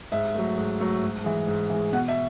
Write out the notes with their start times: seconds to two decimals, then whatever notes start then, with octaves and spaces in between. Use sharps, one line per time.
0.12 G#2 E5
0.35 F#3 A3
0.57 G#2
0.80 F#3 A3
1.02 G#2
1.24 E3 G#3
1.47 G#2
1.70 E3 G#3
1.93 B2 F#5
2.08 E5